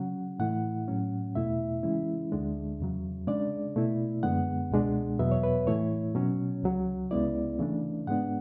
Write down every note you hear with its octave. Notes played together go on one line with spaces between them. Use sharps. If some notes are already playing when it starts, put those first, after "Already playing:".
Already playing: C#3 F#3 C#4 F#5
A2 E3 A3 E4 F#5
A2 F#3 C#4
E2 B2 A3 E4 E5
C#3 E3 G#3 C#4 E4
D2 D3 G#3 D4
E2 C#3 F#3
C#3 G#3 D4 D5
B2 A3 E4
F#2 D3 G#3 B3 F#5
C#2 B2 G#3 D4
E2 B2 F#3 B3 E5
C#5
B4
A2 E3 A3 E4 C#5
B2 F#3 C#4
C#2 C#3 F#3
C#2 C#3 G#3 B3 E4 D5
C#3 E3 A3 D4
G#2 G#3 B3 D4 F#5